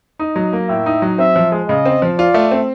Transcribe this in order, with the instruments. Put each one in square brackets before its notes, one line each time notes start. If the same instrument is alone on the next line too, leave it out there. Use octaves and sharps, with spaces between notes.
[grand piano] D#4 [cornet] D#5
[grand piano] F#3
A#3
[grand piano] A2 [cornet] E5
[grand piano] D#4
F#3
[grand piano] C4 [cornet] E5
[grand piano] F3
G#3
[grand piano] C#3 [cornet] D#5
[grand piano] C4
F3
[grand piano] F4 [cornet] D5
[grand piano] A3
C4